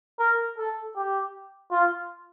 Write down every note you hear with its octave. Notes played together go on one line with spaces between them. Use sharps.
A#4
A4
G4
F4